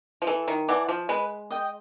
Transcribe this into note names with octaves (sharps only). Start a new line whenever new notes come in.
F3
E3 A4
D#3
E3 D5 F#5 A5
F3
G#3 B4
D#5 G5